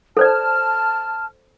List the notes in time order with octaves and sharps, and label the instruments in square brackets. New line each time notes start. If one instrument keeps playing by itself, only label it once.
[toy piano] A4 C5 D5 [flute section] A5 F6